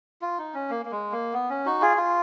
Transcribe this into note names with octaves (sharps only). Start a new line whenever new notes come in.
F4
D#4
C#4
A#3
A#3
G#3
A#3
B3
C#4
D#4 F#4
F4 G#4
F4